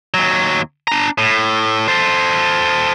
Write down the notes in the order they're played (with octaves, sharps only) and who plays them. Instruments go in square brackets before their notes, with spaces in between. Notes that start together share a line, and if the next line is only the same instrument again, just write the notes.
[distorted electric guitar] D#2 F#3
D4 A#5
A2
A4 C5